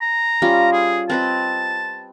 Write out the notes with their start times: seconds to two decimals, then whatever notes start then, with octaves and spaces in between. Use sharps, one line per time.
0.02 A#5
0.42 G3 C#4 F4
0.73 G#4
1.10 C4 B4 D#5 A5